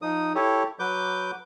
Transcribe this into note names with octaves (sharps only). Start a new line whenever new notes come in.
F3 D#4 D#6
E4 G4 A4 C#5
F#3 B4 D6 G6